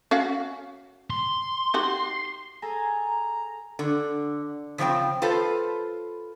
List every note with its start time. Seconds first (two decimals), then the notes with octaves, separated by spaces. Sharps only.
0.11 C#4 F#4 F5
1.10 C6
1.74 D#4 F#4 G4
2.62 G#4 A4 G#5 A#5
3.79 D3
4.78 C#3 F3 C4 D5 G5
5.22 F4 A4 B4 C5